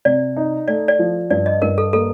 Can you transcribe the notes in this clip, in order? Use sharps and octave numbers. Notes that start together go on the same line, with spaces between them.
C3 D5
D#4
A3 D5
D5
F3
G2 D5
D#5
G2 A#4
A4
A#3 A4